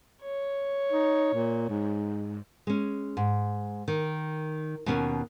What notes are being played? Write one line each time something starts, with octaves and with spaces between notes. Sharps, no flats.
C#5
D#4
A#2
G#2
G#3 C#4
G#2
D#3
D#2 B2 C#4